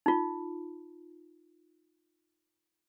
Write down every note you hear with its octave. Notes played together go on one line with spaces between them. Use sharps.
D#4 F4